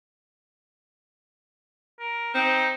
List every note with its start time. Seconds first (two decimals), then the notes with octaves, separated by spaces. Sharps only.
1.99 A#4
2.34 C4 D#4